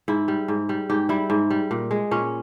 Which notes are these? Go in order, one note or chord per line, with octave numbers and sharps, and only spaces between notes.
G#2 E4
G3
G#2
G3
G#2 G4
G3 E4
G#2
G3
A#2
G#3
A#2 C#4